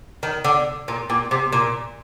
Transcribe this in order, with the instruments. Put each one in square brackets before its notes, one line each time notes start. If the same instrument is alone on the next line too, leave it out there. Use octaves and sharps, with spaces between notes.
[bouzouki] D#3
D3
A#2
A#2
C3
A#2